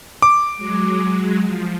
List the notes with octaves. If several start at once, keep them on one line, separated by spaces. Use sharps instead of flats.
D6
F#3 G#3
F3